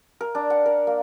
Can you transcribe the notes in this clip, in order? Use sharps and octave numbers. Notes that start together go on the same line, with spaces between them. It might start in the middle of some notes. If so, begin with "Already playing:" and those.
A#4
D4
F#5
A#4
A#3